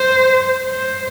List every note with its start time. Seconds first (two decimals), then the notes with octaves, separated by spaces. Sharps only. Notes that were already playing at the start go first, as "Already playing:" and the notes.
Already playing: C5
0.69 C5